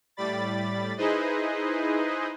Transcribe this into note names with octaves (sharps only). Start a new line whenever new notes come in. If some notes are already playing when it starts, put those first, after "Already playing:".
A2 G3 D5 B5 A6
D#4 E4 G#4 B4 C5 D#5